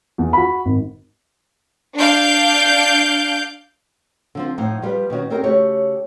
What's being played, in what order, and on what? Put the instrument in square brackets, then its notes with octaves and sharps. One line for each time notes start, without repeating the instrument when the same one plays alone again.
[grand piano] E2
F#4 B5
G#1
[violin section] D4 F5 G6 D7
[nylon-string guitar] D3 F3 C4
A2 F3 D#4 F#5
F3 G3 B3 B4
B2 D#3 C#4 F#4
C4 C#4 D#4 G4 A#4
C#3 A3 F#4 G4 C#5